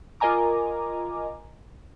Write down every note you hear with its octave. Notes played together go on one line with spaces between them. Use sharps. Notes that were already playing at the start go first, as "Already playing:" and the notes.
F4 A#4 D#5 G#5 A#5 D6